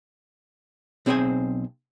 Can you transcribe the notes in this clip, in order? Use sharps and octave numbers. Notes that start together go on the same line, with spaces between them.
B1 C4 G#4 C5 G5 G#5